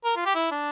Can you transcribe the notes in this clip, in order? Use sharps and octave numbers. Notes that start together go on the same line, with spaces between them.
A#4
F4
G4
E4
D4